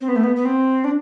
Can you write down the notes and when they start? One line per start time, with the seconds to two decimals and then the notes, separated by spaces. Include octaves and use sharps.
0.01 C4
0.08 B3
0.16 A3
0.23 B3
0.36 B3
0.45 C4
0.84 D4